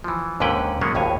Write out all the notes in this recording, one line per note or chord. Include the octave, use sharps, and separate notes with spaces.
E3 F3
D#2 G#2 D3 C#4 B4 G5
F#3 G#3 A#3 B3 C#4
G#1 D#2 A2 C#5 G#5